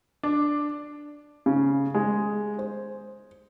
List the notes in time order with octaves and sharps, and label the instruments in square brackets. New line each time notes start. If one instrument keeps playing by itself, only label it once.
[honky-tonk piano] D4
[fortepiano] C#3
G#3
C5